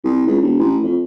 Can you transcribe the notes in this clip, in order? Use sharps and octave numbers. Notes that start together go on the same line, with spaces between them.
C2
C#2
E1
A1
F2